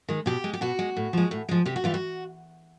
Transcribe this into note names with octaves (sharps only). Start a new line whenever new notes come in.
D#3 G#3
B2 G4
G#3
G4
B2 F#4
G#3
A2
F3 G#3
A2
F3 G#3
C3 G4
F#4
E3 G3 F4
F#4